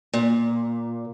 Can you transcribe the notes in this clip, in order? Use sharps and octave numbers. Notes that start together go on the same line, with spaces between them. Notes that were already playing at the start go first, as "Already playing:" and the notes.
A#2